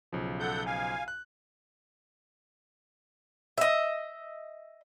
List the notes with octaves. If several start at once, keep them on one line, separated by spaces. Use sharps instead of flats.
B1 C#3 F3
A4 F#5 G6
F5 G#5
F#6
D#5 E5